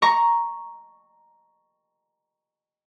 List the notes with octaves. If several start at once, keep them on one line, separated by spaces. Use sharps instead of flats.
A#5 C#6